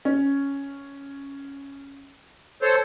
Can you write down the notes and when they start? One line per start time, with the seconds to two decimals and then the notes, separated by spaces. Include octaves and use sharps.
0.05 C#4
2.62 A4 C5 C#5